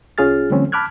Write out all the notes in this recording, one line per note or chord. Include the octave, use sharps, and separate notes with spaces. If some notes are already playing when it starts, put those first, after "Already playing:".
C2 C#4 F4 G#4 F6 A6
D3 F3 G3 A3 C4 C#4
A5 B5 D6 F6 F#6 G#6